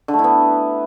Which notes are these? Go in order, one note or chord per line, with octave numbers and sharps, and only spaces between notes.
D3
A3
E4
B3